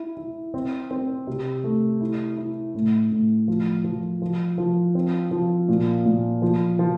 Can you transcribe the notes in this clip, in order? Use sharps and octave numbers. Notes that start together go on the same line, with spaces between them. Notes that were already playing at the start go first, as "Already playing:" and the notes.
Already playing: E4
E4
C4
C4
C3
A3
E4
E4
A2
A2
F3
F3
F3
F3
C4
F3
A#2
A#2
F3
F3